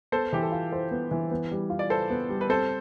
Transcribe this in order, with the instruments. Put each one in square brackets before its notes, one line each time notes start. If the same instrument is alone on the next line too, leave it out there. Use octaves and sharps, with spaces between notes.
[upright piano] B3 [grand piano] A4 C5
[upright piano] E3 [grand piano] G4
[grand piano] A4
[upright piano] F4
[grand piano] A4 [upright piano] C5
[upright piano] B3
E3
B3
G3
F4
[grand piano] D5
[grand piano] A4 C5 [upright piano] B4
[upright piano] B3
G3
[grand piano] B4
[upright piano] C4 [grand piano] A4 C5